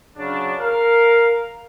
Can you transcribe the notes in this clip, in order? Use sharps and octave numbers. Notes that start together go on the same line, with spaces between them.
C#3 F#3 D4
A#4 F5